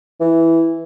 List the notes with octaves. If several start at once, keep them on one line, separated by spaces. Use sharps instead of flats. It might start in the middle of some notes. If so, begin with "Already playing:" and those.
E3